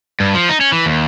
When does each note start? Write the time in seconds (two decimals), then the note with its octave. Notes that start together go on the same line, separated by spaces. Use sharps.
0.20 G2
0.34 F3
0.49 D#4
0.61 C#4
0.72 E3
0.86 D#2